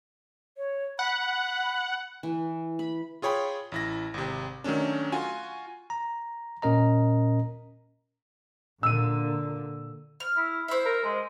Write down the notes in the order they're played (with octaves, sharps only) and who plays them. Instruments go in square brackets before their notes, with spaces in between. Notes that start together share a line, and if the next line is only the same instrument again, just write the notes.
[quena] C#5
[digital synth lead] F#5 [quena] B5
[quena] B5
[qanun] E3
B5
[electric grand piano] F4 G#4 C#5 G5 B5
A1 E4 A#6
G#1 C3
D#3 F#3 A3 C#4 D4
F4 F#4 G#5
[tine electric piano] A#5
A#2 C#4 A#4 D#5 A#5
[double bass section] A#2 D3 [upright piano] E6 D#7
[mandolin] F6
[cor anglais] E4
[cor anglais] E4 [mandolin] C5 E5
[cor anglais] A#4
G#3